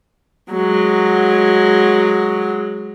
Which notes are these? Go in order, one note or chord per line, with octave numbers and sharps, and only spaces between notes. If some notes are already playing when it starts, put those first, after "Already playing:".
F#3 G#3